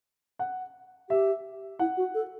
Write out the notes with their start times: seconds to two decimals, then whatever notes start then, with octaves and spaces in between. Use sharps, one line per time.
0.39 F#5
1.10 G4 E5
1.79 E4 F#5
1.97 F#4
2.14 A4